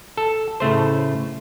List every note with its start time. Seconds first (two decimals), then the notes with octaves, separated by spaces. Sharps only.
0.17 A4
0.60 A2 C#3 A3 C5